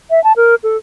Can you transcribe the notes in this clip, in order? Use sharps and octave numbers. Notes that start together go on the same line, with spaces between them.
E5
A5
A#4
A4